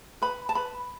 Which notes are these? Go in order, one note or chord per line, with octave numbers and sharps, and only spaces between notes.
B4 B5
A5
B4 B5